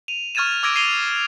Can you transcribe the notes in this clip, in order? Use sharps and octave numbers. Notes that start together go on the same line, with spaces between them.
D#7 F7
C#6 F6 G#6 A6 D#7 E7
D6 E6 G#6 A#6 D7 D#7
C7 D#7 F7 G7